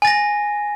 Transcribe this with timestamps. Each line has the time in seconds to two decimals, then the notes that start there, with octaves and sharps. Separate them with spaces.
0.02 G#5
0.05 A6
0.07 A#6